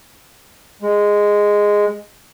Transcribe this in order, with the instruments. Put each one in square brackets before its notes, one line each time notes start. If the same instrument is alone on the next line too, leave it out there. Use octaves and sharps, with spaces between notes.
[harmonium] G#3